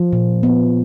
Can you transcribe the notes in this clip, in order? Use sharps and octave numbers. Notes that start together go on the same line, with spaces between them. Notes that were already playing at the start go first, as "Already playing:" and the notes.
Already playing: F3
A#2
B3